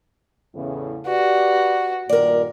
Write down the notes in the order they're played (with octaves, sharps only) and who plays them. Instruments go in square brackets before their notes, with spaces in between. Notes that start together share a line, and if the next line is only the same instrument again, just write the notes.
[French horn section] E2 A2 C#3
[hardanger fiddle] F#4 [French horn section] G4 B4 D5
[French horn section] G2 A#2 D#3 [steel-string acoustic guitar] A#4 D5